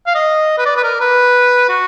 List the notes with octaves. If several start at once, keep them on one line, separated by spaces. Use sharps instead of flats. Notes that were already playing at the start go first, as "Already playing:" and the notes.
F5
D#5
B4
D5
B4
A#4
B4
F#4